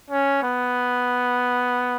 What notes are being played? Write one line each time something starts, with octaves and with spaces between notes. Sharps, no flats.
C#4
B3